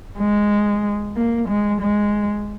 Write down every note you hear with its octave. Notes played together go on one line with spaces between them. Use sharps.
G#3
A#3
G#3
G#3